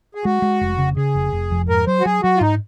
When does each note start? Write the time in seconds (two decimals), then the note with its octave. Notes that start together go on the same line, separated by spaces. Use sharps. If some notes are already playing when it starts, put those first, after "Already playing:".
0.15 G#4
0.24 G#3 F#4
0.42 G#3
0.61 F1
0.78 C#3
0.97 C#3 G#4
1.15 F1
1.32 F1
1.51 F2
1.69 G#2 A#4
1.87 F#3 C5
2.00 F#4
2.05 F#3 G#4
2.23 F#3 F#4
2.37 F4
2.41 G#2 D#4